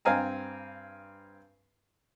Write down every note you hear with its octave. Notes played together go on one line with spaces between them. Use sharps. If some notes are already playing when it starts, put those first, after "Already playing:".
G2 C4 F5 G#5 A#5